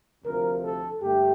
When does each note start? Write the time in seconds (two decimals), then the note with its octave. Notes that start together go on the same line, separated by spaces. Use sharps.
0.24 D2 C3 F3 A#4
0.63 A4
1.01 G2 D3 A3 G4